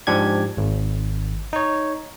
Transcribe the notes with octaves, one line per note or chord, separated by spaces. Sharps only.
G#2 F3 D4 G4 G#6
G#1
D#4 C#5